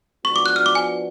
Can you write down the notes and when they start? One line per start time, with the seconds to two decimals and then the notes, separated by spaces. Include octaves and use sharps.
0.25 F3 B3 D4 F#4 C#6
0.36 D6
0.46 F#6
0.56 F6
0.66 D6
0.75 G#5